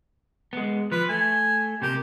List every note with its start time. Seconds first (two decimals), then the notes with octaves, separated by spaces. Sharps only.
0.53 G#3 B3
0.92 F3 B4
1.09 A3 G#5
1.82 C3 A#3 G4